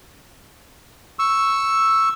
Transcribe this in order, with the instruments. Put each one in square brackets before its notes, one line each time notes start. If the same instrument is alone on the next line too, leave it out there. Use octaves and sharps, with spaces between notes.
[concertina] C#6 E6